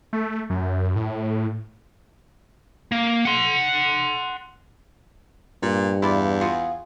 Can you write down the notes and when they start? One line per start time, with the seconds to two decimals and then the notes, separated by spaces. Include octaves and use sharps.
0.13 A3
0.50 F#2
0.96 A2
2.92 A#3
3.25 F#5 C6
5.63 G2 A#2
6.02 E2 E4 F4 D5
6.41 F4 F#4 G#4